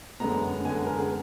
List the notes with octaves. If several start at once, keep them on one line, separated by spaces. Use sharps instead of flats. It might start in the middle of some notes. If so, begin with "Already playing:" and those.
F#2 D3 G#3 B3 A#5
F#2 D3 G#3 B3 G#5
A#4
G#4